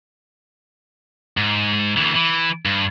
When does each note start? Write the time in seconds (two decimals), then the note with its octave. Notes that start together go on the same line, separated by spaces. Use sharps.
1.37 G#2
1.97 D2 E3
2.15 E3
2.65 G2